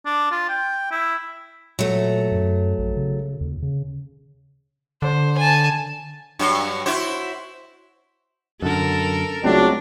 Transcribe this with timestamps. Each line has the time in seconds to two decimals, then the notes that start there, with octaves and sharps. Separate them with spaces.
0.06 D4
0.31 F4
0.49 G5
0.91 E4
1.79 A#2 F#3 A3
2.32 F#2
2.78 A#1
2.97 C#3
3.41 D#2
3.62 C#3
5.02 D3 C5
5.37 G#5 A5
6.39 G2 F#3
6.86 E4 F#4 C5
8.62 F#2 D3 A4 A#4
9.44 C#2 F#3 A3 C4 D4